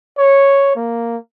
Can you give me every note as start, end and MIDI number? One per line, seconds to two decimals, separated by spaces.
0.18 0.72 73
0.76 1.17 58